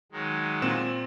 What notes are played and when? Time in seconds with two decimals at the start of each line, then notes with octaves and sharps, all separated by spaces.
0.12 D#3 F#3 G#3
0.62 A#2 C4 E7